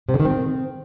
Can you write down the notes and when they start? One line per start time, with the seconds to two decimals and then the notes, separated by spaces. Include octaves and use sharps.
0.09 C3
0.14 D3
0.20 D#3
0.25 C4